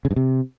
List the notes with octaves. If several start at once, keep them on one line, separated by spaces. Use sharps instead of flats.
C#3
G2
C3